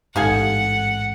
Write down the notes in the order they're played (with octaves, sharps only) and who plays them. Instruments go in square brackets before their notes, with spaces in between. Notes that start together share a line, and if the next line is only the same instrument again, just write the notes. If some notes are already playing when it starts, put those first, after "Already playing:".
[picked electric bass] A1 G#2 [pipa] D#4 F5 G#5 [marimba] G4 A4 [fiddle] F#5